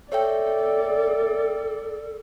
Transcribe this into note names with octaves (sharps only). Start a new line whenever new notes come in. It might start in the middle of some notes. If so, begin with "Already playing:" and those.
A4 C#5 D5 E5 G5